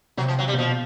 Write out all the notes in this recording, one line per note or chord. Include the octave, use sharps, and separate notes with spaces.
C3 F#3
F3
F#3
G3
C3
B2 F3